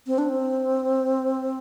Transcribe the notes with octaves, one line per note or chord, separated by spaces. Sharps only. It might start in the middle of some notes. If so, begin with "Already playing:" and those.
C4
D4
C4